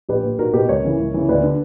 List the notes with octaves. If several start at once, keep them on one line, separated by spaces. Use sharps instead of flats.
A#1 G4 B4
A#2
B1 F#4 A#4
B2 G4 B4
C#2 A#4 C#5
C#3 E3
C#2
C#3 E3
D2 B4 D5
D3